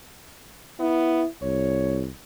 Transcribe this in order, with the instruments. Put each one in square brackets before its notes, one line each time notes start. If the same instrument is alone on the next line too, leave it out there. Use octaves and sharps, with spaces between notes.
[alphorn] B3 [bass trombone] E4
[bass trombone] C2 [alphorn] C#5